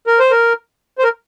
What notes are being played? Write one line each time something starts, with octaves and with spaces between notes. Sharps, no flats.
A#4
C5
A#4
C5
A#4